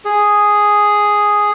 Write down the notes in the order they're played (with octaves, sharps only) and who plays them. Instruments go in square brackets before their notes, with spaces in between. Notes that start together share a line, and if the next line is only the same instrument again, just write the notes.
[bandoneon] G#4